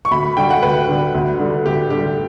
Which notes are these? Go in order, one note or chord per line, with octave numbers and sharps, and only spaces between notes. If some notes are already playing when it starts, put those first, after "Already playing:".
C#6
D2 B5
D3 G3 G5
F#5
D2 B4
D3 G3
D2
D3 G3
D2 G4
D3 G3 G4